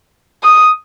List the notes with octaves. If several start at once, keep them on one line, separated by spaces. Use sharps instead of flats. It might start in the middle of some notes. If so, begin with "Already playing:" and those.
D#6